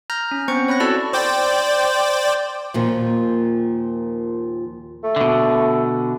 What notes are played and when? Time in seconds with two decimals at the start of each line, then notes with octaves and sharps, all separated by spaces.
0.10 A#5 F6 G6 A#6
0.31 C#4
0.48 B3 C4 C5 C#6 C#7
0.68 C#5 B5 F#6 A#6
0.80 E4 F#4 A4 D5 A5 E6
1.13 C5 D5 G5
2.74 D#2 A#2 F3
5.04 A3
5.16 B2 D3